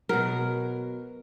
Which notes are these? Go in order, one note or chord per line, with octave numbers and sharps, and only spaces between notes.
B2 F#3 A#4